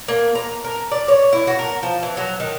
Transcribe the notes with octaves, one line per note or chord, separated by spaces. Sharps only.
A#3
A#5
A#4
D5
C#5
E4
F#4
A#4
F3
E3
F#3
D#3